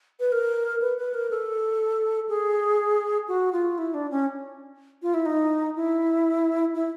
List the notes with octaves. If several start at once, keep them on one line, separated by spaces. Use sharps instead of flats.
B4
A#4
B4
B4
A#4
A4
G#4
F#4
F4
E4
D4
C#4
F4
E4
D#4
E4
E4